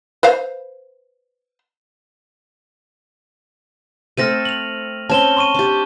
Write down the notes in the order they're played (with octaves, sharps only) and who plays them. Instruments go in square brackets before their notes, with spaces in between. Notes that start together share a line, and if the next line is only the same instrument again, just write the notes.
[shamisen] B4 C5 F5
[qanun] A3 C4 A4 [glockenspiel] F6 A#6 D#7
[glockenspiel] F7 F#7
[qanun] C4 C#4 [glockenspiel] A5 E7 G7
[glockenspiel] C6 C#6 D#7
[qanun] D4 G4